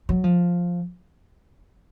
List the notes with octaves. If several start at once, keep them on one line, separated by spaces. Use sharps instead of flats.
F#3
F3